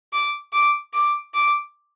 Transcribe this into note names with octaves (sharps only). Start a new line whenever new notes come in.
D6
D6
D6
D6